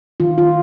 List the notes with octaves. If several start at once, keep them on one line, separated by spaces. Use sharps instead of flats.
D#3 F4
F4